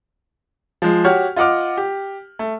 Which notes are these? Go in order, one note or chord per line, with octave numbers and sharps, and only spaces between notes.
F3 G#3
F#4 G4 C#5 F#5 F6
F4 D#5 F#5 D6 F6
G4
A3